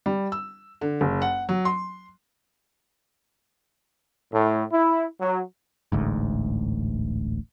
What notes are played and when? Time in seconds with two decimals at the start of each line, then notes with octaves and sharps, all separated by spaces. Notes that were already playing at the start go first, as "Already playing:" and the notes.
0.06 G3
0.32 E6
0.81 D3
1.01 F#1
1.22 F#5
1.49 F#3
1.65 C6
4.32 A2
4.73 E4
5.21 F#3
5.92 D1 A1 D2 G#2